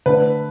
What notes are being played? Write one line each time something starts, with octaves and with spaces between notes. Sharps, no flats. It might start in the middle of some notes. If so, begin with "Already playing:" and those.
D3 A3 B4